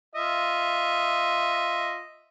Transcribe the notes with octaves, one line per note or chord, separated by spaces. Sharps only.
F4 D#5 E5